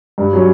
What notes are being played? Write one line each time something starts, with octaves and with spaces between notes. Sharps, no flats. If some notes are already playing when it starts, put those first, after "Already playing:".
G2
F#3 C#4